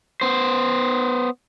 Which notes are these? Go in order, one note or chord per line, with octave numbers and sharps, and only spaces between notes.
B3 C5